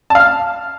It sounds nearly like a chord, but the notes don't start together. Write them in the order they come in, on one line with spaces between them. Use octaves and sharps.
A5 F5 F6